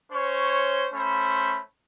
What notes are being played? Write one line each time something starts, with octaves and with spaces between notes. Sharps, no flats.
C#4 C5 C#5
A3 C#4 C5 B5